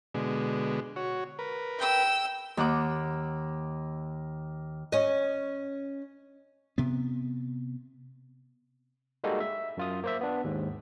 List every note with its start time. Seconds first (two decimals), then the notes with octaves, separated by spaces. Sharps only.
0.14 B2 D3 G#3
0.96 F#4 C#5
1.39 A#4 B4
1.79 G5 E6
2.57 D#2 F#5 D6
4.92 C#4 D#5
6.78 C3 B3
9.24 G3 G#3 A#3 D#4 F#4 A4
9.40 E5
9.77 F#2 F4 D#6
10.04 A#3 C5 E5
10.21 B3 D4
10.44 D#2 G#2